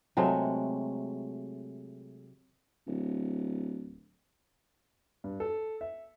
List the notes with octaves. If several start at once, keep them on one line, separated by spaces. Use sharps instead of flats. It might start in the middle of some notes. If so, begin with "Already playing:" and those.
C3 F#3 G#3 A3
D1
G2
A4
E5